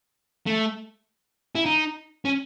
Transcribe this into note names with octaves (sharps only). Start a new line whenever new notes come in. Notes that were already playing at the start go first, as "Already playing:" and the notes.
A3
E4
D#4
C#4